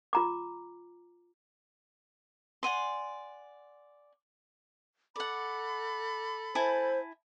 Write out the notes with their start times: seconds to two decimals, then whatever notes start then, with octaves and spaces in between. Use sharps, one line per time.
0.13 F4 A#5 D6
2.63 D5 F#5 G#5 C6
5.16 A4 D5 F#5 B5
6.55 E4 C5 G#5 A5